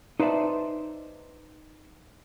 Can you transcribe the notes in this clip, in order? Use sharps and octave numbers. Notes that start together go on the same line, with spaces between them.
D#4 B4 C5 D5 E5 A5